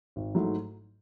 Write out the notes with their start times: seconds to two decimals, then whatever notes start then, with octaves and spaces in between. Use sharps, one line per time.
0.16 G#1
0.35 G#2 F#3 A3 E4